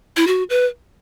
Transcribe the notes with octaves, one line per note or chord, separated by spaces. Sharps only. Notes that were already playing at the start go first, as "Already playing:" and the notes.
E4
F#4
B4